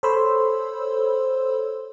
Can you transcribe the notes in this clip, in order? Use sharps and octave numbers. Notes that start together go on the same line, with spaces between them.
A4 C5 C#5 B5 C6 E6